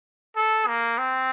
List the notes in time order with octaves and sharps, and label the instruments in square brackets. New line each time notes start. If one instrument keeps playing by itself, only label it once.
[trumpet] A4
A#3
C4